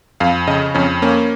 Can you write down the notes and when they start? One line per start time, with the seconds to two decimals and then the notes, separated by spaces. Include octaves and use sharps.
0.20 F2 F5
0.47 C#3 D#5
0.75 F2 C#4
1.02 A#3 C#4